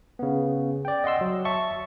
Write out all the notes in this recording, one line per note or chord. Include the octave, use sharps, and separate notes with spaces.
C#3 B3
D5 G5
D#5 F#5 C6 E6
F#3
E5 A5 C#6